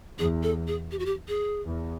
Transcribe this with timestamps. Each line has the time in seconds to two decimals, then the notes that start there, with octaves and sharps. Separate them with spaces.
0.18 E2 G#4
0.43 A4
0.68 G#4
0.91 G4
0.99 F#4
1.06 G4
1.28 G#4
1.65 E2